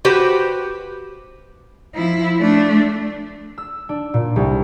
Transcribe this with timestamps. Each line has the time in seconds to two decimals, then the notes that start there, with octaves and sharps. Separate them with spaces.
0.05 F#4 G4 B4 C5
1.94 F3 E4
2.39 A3 D4
3.58 E6
3.89 D4
4.14 A#2
4.36 C2